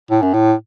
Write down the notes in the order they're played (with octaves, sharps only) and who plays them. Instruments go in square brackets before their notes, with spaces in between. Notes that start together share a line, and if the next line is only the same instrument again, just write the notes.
[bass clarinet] A2
F#2
A2